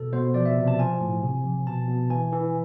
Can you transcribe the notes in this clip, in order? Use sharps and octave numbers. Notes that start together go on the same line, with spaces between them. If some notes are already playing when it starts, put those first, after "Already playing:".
Already playing: B2 A4
B2 C5
F3 D5
E5
C3
A5
F3 G#5
A2
C3
F3
B2 A5
B2
E3 G#5
E3